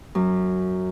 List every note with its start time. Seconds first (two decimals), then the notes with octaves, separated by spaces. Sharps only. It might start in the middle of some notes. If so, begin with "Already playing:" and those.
0.15 F#2